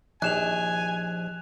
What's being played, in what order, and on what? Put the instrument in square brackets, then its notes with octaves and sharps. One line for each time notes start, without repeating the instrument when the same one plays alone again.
[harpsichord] A#1 D#2 [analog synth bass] F3 [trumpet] G#5 [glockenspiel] F#6 E7 F7